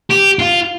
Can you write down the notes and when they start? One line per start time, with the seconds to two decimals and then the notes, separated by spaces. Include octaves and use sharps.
0.10 G4
0.39 F4